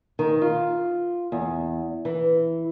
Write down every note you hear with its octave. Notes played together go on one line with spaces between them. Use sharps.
D#3
F4
E2
E3